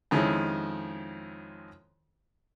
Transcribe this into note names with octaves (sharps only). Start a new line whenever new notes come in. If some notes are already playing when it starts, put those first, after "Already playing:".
F2 D#3 F3 G#3 C#4 E4